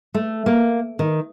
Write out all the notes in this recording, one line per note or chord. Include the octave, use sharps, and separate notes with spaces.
A3
A#3
D#3